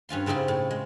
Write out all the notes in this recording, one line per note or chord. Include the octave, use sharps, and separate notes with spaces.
G2 C#4 F4 C6
G#2 C#3 C4 E4 F4
A2
G#3